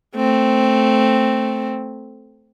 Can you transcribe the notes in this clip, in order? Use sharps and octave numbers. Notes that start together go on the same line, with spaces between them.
A3 C4